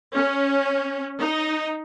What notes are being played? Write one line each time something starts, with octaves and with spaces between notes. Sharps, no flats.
C#4
D#4